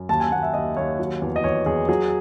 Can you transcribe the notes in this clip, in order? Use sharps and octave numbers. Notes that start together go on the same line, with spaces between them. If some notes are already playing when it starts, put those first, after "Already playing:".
Already playing: F#2
D#2 A5
G#5
D#2 F#5
E5
D#2 D#5
D#2 C#5
F#3
E2
D#5
E2 C#5
E2 G#4
F#3 G#4